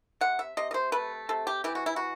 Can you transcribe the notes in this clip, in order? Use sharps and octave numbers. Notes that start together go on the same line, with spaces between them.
C3 F#5
E5
C3 D#5
D#5
C5
A3 B4
C3 A4
G4
E3 G4
F#4
E4
F#4